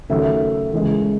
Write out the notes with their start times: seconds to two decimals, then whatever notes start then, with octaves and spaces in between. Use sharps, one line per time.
0.09 D#2 C#3 F#3 A3 E5
0.73 E2 C#3 G#3